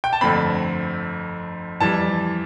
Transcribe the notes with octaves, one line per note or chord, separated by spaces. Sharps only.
G5
A5
G1 F2 D3 A3 C4 B5
F2 E3 G3 A5